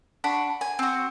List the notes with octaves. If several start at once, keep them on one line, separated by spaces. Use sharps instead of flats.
D4 F#5 B5 C#6
G#5
C4 F#4